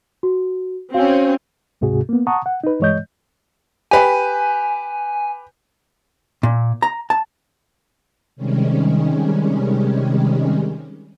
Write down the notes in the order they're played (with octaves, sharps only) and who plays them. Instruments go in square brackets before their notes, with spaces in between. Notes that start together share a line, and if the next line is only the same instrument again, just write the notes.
[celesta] F#4
[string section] C4 C#4 [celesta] F#4 F5
[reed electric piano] D2 G#2 C3 F#4 G#4
A#3 B3
F#5 A5 A#5 C#6 D#6
F#5
D#4 B4
G2 E3 G#3 C#5 D#5 G6
[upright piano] G4 B4 [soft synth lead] G#5
[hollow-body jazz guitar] A#2
A#5
A5
[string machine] C3 D#3 G3 G#3 C#4